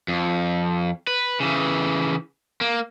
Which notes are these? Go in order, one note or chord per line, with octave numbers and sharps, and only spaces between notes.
F2
B4
C#3 E3
A#3